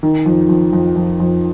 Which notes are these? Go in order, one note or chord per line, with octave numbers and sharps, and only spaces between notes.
D#3
F2
F2
F2
F2
F2